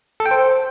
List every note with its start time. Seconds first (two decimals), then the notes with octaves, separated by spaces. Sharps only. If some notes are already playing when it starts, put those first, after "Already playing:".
0.20 A4
0.26 G5
0.31 C5